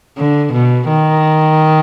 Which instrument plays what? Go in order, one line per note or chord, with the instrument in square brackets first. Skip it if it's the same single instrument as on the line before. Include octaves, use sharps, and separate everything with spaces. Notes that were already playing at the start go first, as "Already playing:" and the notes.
[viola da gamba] D3
B2
D#3